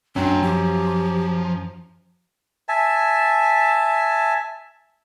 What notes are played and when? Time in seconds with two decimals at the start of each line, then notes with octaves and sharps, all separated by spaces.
0.16 F#2 C#4 D4 G5
0.42 F3 G4
2.68 E5 G#5 A5